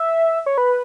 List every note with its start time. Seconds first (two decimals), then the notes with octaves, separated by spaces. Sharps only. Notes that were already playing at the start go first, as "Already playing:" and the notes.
Already playing: E5
0.46 C#5
0.58 B4